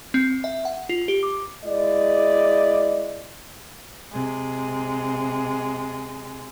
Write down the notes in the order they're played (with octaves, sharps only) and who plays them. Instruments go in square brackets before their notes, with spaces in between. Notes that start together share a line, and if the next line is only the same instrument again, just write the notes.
[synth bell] C4
E5
F#5
F4
G4
D6
[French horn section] G#3 E4 D5 D#5
[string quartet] C3 G#3